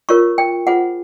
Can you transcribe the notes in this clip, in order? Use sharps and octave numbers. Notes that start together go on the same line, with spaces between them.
F4 A#4 C#5 C#6
G5
F4 G#4 C5 F#5